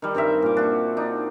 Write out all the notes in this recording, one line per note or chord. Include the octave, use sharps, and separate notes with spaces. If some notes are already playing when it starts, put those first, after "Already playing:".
D#3 G3
G2 C4 A#4 E5
A#2 D6
D4 F#4
D4 D#4